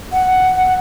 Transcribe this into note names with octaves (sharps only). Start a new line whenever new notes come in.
F#5